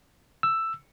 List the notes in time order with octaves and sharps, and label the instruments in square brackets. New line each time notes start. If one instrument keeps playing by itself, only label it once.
[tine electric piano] E6